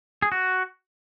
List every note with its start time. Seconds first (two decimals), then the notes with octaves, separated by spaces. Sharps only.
0.22 G#4
0.32 F#4